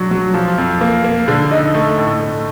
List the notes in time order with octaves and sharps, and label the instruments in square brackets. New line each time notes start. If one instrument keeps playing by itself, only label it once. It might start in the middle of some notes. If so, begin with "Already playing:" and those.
Already playing: [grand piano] F#3 D4
F#3
F3
F2
A#3
A#3
D3
D#4
A3
A2
A2